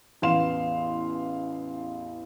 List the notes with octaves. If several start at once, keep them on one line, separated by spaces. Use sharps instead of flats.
A1 E2 B3 F5 C6 E7